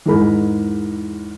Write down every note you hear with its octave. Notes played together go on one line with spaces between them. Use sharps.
E2 G#2 G#3 A#4 B5